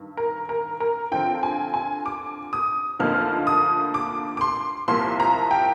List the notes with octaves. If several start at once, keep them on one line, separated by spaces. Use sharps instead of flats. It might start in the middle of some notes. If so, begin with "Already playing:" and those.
Already playing: G2 D#3
A#4
A#4
A#4
D3 F3 C4 F4 G5
G#5
G#5
D6
D#6
D2 D3 F3 A#3 D#4 F6
D#6
D6
D6
C6
C2 C3 F3 A#3 C6
A#5
G5